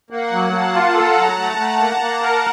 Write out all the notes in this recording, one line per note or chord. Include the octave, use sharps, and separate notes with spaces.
A#3 F#5
F#3
A#3 A5
F4
A4 A#5
F#3
A3
A3
A#3
A#3
A#4